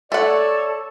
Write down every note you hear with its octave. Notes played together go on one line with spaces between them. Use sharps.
A3 A4 C#5 D5 F#5